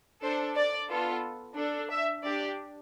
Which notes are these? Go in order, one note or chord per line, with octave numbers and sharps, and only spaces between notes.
D4 A4 C5
D5
B3 F4 A4
D4 A4
E5
D4 G4 D5